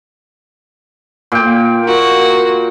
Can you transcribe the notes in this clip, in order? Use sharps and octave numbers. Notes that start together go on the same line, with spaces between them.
A#2 G5
A#3 F#4